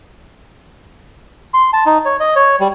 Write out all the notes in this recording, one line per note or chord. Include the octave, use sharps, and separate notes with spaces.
C6
A5
D#4
C#5
D#5
C#5
G3